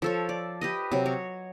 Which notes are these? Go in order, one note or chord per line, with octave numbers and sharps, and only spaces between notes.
F3 A4 C#5
D5
G4 B4 D#5
C3 F#3
C#5